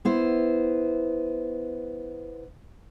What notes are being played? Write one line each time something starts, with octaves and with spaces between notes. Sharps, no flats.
B3 E4 C5